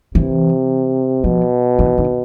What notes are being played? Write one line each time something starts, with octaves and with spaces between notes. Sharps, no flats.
C3 E3
B2 F3
E3
D#3